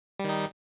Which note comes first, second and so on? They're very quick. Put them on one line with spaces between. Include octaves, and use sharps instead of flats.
G3 D#3 D#4